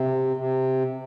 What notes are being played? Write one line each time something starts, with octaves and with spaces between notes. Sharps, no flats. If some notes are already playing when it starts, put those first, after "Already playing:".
Already playing: C3
C3